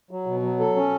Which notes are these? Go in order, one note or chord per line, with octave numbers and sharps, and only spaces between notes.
F#3
B2
F#3
A4
C#4